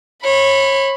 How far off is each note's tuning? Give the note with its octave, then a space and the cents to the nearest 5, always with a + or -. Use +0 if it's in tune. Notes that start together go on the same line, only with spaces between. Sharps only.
C#5 -30 B5 +5